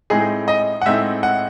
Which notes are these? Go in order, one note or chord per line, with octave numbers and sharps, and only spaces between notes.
A2 G#3 C4 D#4 G#4
D#5
F#5
A2 G#3 C4 D#4 E5
F#5